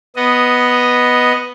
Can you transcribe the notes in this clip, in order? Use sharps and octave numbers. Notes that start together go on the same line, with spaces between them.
B3 D#5